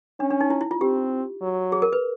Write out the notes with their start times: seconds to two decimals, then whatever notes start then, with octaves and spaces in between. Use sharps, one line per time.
0.20 C#4 D4
0.31 D4
0.41 D#4
0.50 E4
0.61 E4
0.71 F4
0.81 C4 G4
1.42 F#3
1.72 G#4
1.82 A#4
1.93 B4